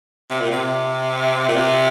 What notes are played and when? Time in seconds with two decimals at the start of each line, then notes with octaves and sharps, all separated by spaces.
0.30 C3
0.41 A#2
0.51 C3
1.48 A#2
1.56 C3